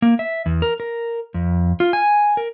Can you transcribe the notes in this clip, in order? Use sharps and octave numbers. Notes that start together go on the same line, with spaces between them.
A#3
E5
E2
A#4
A#4
F2
F4
G#5
A#4